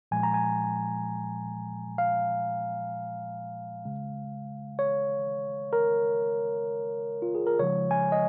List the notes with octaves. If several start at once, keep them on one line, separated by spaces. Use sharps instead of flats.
A#2 F3 G#3 G#5
A#5
G#5
F5
C#3 G#3
C#5
A#4
F4
G#4
A#4
C#3 F3 G#3 C#5
G#5
D#5